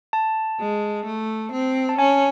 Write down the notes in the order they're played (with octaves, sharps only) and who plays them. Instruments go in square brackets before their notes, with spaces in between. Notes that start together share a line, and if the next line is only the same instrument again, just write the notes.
[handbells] A5
[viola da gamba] G#3
A3
C4
[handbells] A5
[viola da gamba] C#4 [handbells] G#5